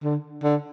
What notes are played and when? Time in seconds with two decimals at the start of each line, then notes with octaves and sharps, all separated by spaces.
0.03 D3
0.43 D3